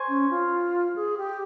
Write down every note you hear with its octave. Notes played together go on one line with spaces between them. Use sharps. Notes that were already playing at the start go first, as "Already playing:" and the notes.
Already playing: C5 G#5 C#6
C#4
F4
G#4
G4